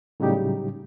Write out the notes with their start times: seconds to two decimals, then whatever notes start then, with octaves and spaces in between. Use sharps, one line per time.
0.20 A2 C#3 F#3 G3 D#4 G4